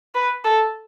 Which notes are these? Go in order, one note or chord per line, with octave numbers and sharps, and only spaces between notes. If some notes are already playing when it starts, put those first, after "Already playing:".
B4
A4